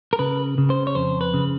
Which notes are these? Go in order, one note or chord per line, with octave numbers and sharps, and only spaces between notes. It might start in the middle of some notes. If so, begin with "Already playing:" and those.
A#4
C#3 B4
C#3
C5
C#5
F2 C5
B4
C#3